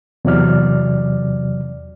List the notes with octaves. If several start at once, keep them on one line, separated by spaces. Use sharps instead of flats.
E2 C3 F#3 D5 F6